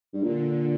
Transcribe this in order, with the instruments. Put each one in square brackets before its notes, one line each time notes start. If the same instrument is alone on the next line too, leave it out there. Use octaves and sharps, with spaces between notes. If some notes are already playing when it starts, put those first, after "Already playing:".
[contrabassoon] G2
[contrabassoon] A#2 [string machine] D3